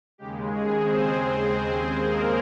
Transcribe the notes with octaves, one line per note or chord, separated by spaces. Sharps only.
D#2 C#3 G#3 G4
G#3 G#4
C4 C5
A#3 A#4